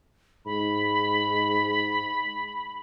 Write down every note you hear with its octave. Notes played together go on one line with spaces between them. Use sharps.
G#2 B5